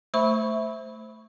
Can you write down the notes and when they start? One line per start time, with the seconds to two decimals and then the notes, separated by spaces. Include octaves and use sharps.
0.14 A3 C5 E5 B5 C#6